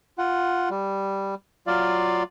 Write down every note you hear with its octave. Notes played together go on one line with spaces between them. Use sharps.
F4 F#5
G3
F#3 F4 D5 F5